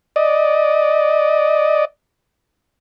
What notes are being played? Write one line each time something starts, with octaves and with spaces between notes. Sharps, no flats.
D5 D#5